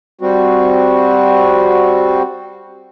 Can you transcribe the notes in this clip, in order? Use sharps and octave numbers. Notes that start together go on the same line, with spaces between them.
G3 C4 F#4